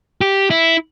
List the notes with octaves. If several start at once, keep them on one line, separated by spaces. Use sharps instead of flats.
G4
E4